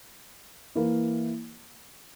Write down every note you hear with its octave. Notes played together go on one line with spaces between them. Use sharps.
E3 A#3 E4